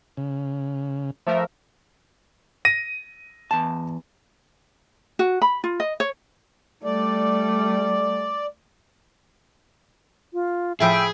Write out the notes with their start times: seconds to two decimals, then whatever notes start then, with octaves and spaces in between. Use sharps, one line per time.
0.17 C#3
1.27 F3 A3 A#4 E5
2.65 A#6 D#7
3.51 E2 A5
5.19 F#4
5.42 B5
5.64 F4
5.80 D#5
6.00 C#5
6.84 G3 A3 D5
10.33 F4
10.80 A2 F3 G#4 E5 G5 B5